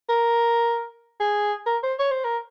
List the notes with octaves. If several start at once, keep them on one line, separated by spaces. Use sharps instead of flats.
A#4
G#4
A#4
C5
C#5
C5
A#4